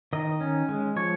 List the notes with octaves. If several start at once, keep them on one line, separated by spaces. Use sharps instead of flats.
D#3 D#5
C#4
G#3
F3 C#5